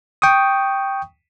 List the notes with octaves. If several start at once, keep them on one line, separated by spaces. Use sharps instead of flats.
G5 C#6 D#6